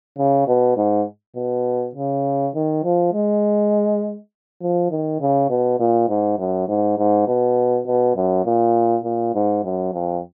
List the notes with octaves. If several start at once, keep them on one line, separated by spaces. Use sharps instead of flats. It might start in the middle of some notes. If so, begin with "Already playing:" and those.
C#3
B2
G#2
B2
C#3
D#3
F3
G#3
F3
D#3
C#3
B2
A#2
G#2
F#2
G#2
G#2
B2
B2
F#2
A#2
A#2
G#2
F#2
F2